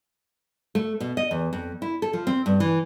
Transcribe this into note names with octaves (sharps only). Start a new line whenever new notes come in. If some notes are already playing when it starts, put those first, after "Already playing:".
A3
B2
D#5
E2
F2
E4
A4
F3
C4
G2
E3